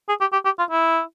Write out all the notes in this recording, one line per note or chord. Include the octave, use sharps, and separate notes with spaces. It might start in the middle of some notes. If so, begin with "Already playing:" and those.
G#4
G4
G4
G4
F4
E4